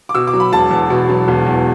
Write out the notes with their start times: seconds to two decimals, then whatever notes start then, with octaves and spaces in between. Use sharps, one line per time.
0.09 D6
0.15 B2 E6
0.27 D6
0.33 F#3
0.40 B5
0.52 E1 A5
0.71 E2
0.90 B2
1.09 F#3
1.28 E1
1.46 E2